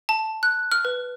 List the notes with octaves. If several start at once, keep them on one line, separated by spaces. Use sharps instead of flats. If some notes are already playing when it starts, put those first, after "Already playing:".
A5
F#6
F6
B4